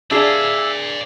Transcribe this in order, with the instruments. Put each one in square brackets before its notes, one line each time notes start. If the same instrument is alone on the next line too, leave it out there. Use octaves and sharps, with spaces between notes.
[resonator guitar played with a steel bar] D4 G#4 [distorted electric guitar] D5 F5 [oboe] E5